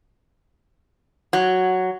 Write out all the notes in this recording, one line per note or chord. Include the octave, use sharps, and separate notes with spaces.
F#3